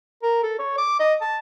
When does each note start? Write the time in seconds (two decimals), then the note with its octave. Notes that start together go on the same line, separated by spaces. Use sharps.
0.23 A#4
0.43 A4
0.59 C#5
0.78 D6
0.99 D#5
1.21 A5